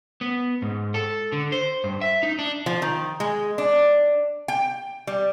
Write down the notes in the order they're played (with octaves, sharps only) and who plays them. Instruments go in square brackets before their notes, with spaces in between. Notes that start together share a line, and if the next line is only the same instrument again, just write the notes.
[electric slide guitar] B3
G#2
A4
D3
C5
G2
E5
D#4
D4
[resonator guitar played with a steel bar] F3
D#3
G#3
D4
G5
G3